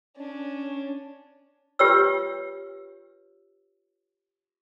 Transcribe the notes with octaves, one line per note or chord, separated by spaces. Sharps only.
C#4 D4
F4 G4 B4 C#5 E6